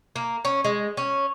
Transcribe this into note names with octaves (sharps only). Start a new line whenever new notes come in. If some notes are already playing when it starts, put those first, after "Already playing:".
A#3
C#4
G#3
C#4